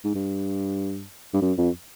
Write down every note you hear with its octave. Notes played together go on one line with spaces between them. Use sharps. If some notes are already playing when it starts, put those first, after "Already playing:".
G#2
G2
G2
F#2
F2